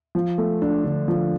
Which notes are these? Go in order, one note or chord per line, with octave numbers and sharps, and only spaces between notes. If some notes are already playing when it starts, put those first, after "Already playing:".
F3
A3
D4
D3
F3